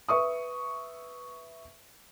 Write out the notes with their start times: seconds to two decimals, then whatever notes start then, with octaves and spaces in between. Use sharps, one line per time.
0.09 B4 E5 C#6 D#6